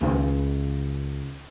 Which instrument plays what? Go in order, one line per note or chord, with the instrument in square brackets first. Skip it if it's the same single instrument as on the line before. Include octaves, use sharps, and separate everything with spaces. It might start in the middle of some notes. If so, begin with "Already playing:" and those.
[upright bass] C#2